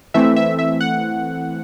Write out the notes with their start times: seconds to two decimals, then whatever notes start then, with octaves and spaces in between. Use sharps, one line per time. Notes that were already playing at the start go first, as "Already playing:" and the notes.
0.14 E3 A3 C4 E5
0.36 E5
0.59 E5
0.81 F#5